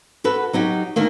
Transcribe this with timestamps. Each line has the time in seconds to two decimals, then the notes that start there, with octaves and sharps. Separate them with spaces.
0.24 F#4 A4 B4
0.53 F#3 D#4 F#4 G4
0.96 D2 D#3 A#3